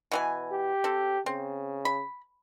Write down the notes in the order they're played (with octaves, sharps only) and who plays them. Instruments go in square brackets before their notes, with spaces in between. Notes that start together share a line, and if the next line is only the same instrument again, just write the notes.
[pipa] B2 E3 G#5
[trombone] G4
[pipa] C4 A4
[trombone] C#3 [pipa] C4
[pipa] B5